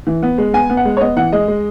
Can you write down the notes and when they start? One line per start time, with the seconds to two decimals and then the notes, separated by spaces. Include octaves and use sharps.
0.07 E3
0.23 B3
0.38 G#3
0.54 B3 G#5
0.70 B3
0.77 F#5
0.85 G#3
0.97 C#5
1.01 B3 D#5
1.17 E3 F#5
1.32 G#3 D#5
1.48 G#3